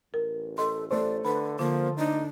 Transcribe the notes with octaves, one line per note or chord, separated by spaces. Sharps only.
A1 A#4
A4 D#5 C6
A3 A4 C5 D5
D3 B4 B5
D3 F3 A#3
D4 D#4